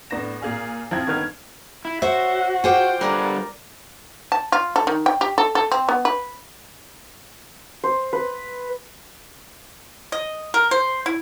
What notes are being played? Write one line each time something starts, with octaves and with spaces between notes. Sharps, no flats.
A2 B3 D4 A#6 E7
A#2 G#4 F5 G#5
F3 C4 E4 G#6
G1 D#3 B3 F6 G#6
E4
F#4 C5 C#5 E5
F4 G#4 C5 F#5 G5 D6
D3 G3 A#4 B4 D5 A#5
A5
F4
A4
D#3
G5
G4
A4
A4
C4
B3
B4
C5
B4
D#5
A#4
C5
E4